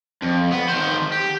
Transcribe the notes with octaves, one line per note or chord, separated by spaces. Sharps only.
F2
B3
D#3 C5
G4